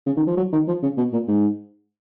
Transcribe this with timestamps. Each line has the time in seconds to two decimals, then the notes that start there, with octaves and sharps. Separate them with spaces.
0.06 C#3
0.17 D#3
0.27 F3
0.37 F#3
0.53 D#3
0.68 F3
0.83 C#3
0.98 B2
1.13 A#2
1.28 G#2